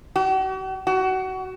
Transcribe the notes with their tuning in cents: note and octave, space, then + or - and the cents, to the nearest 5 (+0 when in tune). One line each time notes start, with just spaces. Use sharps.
F#4 +45
F#4 +25